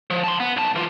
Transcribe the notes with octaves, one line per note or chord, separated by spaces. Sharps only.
F3
A5 C6
B3
B1 A5
E3 F4